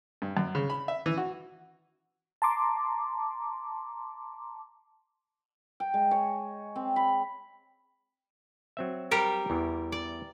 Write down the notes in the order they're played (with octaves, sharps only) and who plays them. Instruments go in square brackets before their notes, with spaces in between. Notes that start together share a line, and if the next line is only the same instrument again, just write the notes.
[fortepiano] G2
F#2
C#3
B5
E5
E3
F#4
[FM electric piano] A5 A#5 C6 D6
[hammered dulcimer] G5
G#3
C#5
C4
B5
[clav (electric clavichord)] F#3 C4 E5
[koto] G3 G4 A#4
[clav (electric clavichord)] E2 E3
[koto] D5